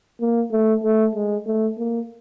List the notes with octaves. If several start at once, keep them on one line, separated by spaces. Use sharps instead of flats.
A#3
A3
A3
G#3
A3
A#3